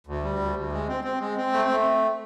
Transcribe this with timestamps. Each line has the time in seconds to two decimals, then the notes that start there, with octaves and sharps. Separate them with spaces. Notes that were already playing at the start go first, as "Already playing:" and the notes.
0.07 D2
0.23 G3
0.39 D2
0.56 D2
0.72 G#3
0.89 C4
1.04 C4
1.20 G#3
1.37 C4
1.53 A3
1.69 A3